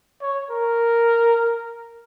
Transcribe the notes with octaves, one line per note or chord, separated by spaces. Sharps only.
C#5
A#4